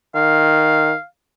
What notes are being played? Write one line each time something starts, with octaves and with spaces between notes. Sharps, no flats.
D#3 F5